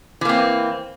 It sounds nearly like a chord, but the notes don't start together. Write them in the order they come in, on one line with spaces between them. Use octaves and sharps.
E3 A#3 C4